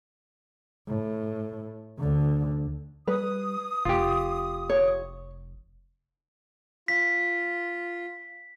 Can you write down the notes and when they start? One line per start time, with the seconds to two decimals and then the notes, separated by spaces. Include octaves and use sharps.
0.88 A2
1.99 D2 D3
3.07 G3 B4 D#6
3.85 F1 F4 G4
4.69 C#5
6.88 F4 B6